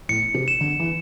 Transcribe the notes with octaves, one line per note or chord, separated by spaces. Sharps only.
A2 C#7
C3
E7
D3
E3